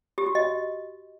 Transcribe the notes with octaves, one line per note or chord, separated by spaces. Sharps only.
G4
F#4
D#5